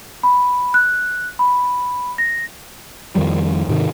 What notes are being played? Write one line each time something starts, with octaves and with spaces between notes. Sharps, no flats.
B5
F#6
B5
A#6
F2 D#3 F3 G3
G#2 C3 D#3